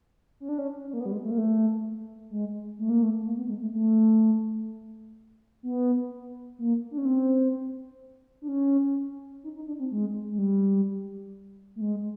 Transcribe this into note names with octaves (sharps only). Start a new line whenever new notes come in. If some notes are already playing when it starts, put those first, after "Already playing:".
C#4
D4
C#4
C#4
A#3
B3
G3
G#3
A3
A#3
A3
G#3
A3
A#3
A3
A#3
B3
G#3
A3
A3
B3
A#3
D4
C#4
C4
D4
C#4
D#4
D#4
D4
C4
G#3
G#3
G3
A3
G#3